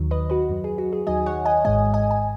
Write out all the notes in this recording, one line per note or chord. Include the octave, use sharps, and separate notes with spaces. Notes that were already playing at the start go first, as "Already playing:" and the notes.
Already playing: D#2 D#3 F#3
B4 D#5
F#4 B4
F#2 F#3
G#4
F#4
G#4
D#2 D#3 F#3 D#5 G#5
C#5 F#5
D#5 G#5
G#1 G#2 G#3 D#5 G#5
D#5 G#5
G#5